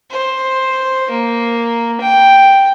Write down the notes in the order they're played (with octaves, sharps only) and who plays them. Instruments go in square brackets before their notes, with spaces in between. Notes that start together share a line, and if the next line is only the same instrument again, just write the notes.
[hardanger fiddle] C5
A#3
G5